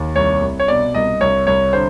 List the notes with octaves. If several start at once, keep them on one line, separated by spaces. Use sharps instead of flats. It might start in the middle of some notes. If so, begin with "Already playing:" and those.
Already playing: D#2
C2 C#5
C2
C#5
B2 D5
C2 D#5
C2 C#5
C2 C#5
D3 C5